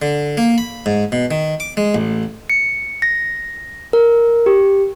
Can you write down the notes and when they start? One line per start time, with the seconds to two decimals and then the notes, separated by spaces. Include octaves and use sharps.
0.02 D3
0.37 A#3
0.58 B5
0.86 G#2
1.12 B2
1.31 D#3
1.60 D6
1.77 G#3
1.95 A1
2.50 C#7
3.02 A#6
3.93 A#4
4.46 G4